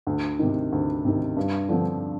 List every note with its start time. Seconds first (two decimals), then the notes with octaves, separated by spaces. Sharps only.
0.07 D2
0.39 C3 D#3
0.72 D2
1.05 C3 D#3
1.37 G2
1.69 D3 F3 C4